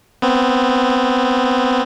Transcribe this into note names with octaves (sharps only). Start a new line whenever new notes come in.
B3 C4